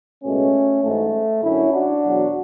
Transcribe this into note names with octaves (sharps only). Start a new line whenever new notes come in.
C#2 B2 G#3 A3 C#4
A1 G#2 G#3 A3
F#2 D3 F#3 C#4 E4
D4 F#4
E2 B2 F#3